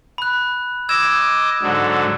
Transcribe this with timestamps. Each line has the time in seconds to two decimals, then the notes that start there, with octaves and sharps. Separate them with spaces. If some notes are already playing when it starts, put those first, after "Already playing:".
0.18 B5 F#6
0.89 D#5 D6 E6 G#6 E7
1.62 G#2 D3 F#3